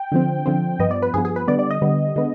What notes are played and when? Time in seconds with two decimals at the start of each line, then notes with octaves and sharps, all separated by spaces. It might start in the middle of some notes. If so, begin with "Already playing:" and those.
Already playing: G5
0.12 D3 F3 C4
0.46 D3 F3 C4
0.79 G2 F3 B3 D#5
0.91 D5
1.02 B4
1.14 G2 F3 B3 G#4
1.25 G#4
1.36 B4
1.48 D3 G3 B3 D5
1.59 D5
1.71 D#5
1.82 D3 G3 B3
2.16 D3 G#3 B3